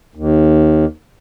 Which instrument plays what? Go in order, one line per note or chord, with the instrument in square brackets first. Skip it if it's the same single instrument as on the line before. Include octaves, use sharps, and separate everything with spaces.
[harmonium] D#2